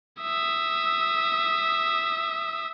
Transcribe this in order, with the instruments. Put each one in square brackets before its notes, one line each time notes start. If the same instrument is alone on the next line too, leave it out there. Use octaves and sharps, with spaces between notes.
[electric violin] E5 D#6